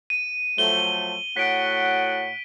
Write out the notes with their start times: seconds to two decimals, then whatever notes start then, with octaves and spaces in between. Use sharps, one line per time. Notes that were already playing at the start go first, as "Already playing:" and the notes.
0.10 D#7
0.58 F3 F#3 A3 G7
1.37 A2 F#4 F#5 B6 D7